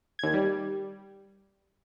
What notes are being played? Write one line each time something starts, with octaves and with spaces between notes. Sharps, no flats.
D#2 G#6
G3